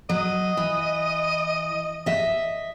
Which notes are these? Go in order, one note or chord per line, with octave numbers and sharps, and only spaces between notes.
F#3 D#5
E3
D#5 E5